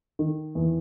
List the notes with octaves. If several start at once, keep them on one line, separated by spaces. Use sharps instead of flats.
D#3
E2